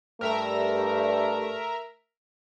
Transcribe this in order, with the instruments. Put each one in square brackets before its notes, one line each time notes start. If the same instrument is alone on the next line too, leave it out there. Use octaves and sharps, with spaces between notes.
[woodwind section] G2 [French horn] A3 [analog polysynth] A#4 E5 A#5